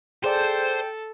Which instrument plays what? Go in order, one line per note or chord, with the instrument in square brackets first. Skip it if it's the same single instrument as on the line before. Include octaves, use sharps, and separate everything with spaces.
[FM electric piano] G#4 D5 A5 [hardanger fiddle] A4 [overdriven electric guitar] C5 [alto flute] G5